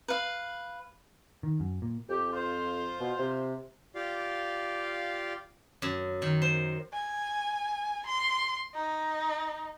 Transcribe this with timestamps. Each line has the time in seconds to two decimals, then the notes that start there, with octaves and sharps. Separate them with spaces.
0.08 B4 F5
1.43 D#3
1.60 F#2
1.82 A#2
2.09 F2 G4
2.33 F4 C5
3.00 B2
3.19 C3
3.95 F4 G4 D5 F5
5.82 F#2
6.22 D#3
6.42 C5
6.93 G#5
8.06 C6
8.75 D#4